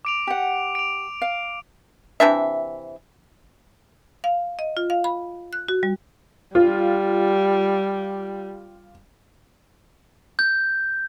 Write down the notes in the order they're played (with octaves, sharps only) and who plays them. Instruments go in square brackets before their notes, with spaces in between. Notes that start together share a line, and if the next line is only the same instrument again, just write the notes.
[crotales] D6 D7 F7
[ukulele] G4 F#5
[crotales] D7 F7
[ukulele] F5
[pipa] C3 E3 D4 E5
[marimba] F5
D#5
F4
F5
B5
F#6
F#4
G3
[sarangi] G3 [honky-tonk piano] F4
[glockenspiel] G6